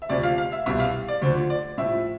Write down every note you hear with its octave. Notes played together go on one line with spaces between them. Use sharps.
E5
D2 C3 F3 D5
F5
F5
E5
C2 B2 G3 E5
F5
D5
D2 D3 F3 C5
D5
A2 F3 E5